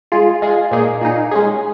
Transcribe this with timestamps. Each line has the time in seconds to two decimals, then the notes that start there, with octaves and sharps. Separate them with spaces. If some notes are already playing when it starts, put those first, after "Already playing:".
0.12 G#3 F4 G#4
0.42 G#3 F4 G#4
0.71 A#2 A#3 D#4 G#4
1.01 A#2 A#3 D#4 G#4
1.31 G#3 C#4 G#4